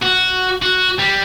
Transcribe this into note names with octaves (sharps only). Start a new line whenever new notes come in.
F#4
F#4
G3